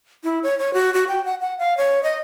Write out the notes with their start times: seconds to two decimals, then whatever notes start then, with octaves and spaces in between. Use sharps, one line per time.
0.24 E4
0.43 C#5
0.59 C#5
0.74 F#4
0.94 F#4
1.08 G5
1.25 F#5
1.41 F#5
1.59 F5
1.77 C#5
2.03 D#5